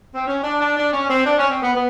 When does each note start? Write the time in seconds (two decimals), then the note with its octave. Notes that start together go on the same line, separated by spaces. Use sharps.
0.15 C4
0.27 C#4
0.44 D4
0.60 D4
0.76 D4
0.93 C#4
1.09 C4
1.25 D4
1.38 C#4
1.50 C4
1.62 B3
1.75 B3